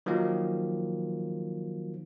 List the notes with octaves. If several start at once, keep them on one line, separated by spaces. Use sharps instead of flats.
D#3 F3 F#3 A#3